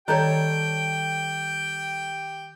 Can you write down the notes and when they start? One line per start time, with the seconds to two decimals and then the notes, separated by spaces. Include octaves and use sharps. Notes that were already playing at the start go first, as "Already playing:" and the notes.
0.08 D#3 G3 G4 A4 C#5 G5 A#5 G6